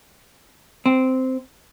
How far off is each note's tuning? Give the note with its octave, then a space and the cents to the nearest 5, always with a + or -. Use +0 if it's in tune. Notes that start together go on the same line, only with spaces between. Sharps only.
C4 -10